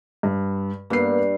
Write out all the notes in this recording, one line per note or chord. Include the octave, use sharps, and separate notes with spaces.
G2
G2 A#3 B3 C7